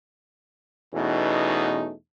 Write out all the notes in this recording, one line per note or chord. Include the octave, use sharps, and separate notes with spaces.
E2 B2 A3 C#4 D#4